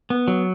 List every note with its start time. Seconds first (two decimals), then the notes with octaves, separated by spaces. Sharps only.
0.10 B3
0.28 F#3